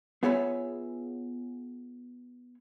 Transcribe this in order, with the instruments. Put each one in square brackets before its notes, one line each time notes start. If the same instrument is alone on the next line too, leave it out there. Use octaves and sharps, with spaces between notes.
[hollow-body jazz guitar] B3 F4 G#4 C#5 E5 B5